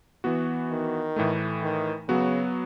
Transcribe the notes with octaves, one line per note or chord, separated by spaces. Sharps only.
E3 B3 F#4
D#3
A2 E3 A3
D#3
C#3 F#3 B3 F#4